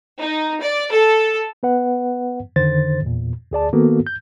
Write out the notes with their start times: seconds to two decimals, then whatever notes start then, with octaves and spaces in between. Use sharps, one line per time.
0.18 D#4
0.61 D5
0.92 A4
1.63 B3 B4 F#5
2.56 F2 D3 D#3 C5 A6
3.02 E2 A#2
3.51 D2 G#4 D5 A5
3.73 D#3 A#3 B3 F#4 A4
4.07 G6